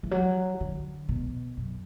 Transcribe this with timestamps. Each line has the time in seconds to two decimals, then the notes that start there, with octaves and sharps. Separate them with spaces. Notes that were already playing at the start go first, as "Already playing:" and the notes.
0.03 E3
0.11 F#3
0.60 D3
1.09 B2
1.57 F#2